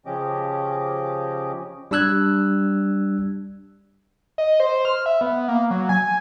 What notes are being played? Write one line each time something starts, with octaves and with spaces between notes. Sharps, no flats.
C#3 F3 C#4 G4 D#5 D6
G3 D4 E6 F#6 G#6
D#5
C5
F6
E5
B3
A#3
F#3
G#5